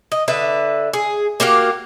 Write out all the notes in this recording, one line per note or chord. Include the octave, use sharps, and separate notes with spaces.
D#5
D3 B4 E5
G#4
A#3 F#4 G4 F5